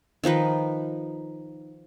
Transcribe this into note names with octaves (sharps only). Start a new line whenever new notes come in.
D#3 F3 D#4 B4